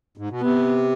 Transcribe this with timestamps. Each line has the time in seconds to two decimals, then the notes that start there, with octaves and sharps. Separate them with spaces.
0.17 G#2
0.30 B2
0.41 C3 B3